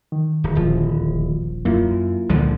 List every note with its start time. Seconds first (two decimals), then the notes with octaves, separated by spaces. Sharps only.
0.12 D#3
0.44 D1
0.55 D#1 A#1 F3
1.65 F#2 A#3 E4 F4
2.30 C#2 A#2 D3 F3 G3 G#3